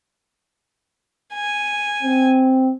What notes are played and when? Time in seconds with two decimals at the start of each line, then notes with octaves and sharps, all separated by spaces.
1.34 G#5
2.03 C4